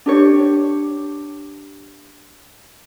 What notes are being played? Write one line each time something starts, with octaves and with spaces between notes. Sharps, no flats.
D4 G4 C#5